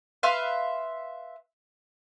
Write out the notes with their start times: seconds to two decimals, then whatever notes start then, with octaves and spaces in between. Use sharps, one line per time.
0.23 B4 E5 F5 C6